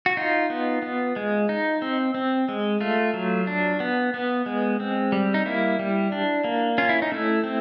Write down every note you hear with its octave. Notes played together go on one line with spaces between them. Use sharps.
F#4
D#4 F4
B3
B3
G#3
D#4
C4
C4
G#3
A3 F4
F#3
D4
B3
B3
G#3
C4
G3
D#4
A#3 E4
G3
D4
A#3
C#4 F4
E4
D#4
A3 E4
C4